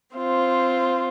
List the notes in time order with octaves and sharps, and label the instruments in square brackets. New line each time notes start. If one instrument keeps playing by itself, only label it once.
[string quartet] C4 F4 C5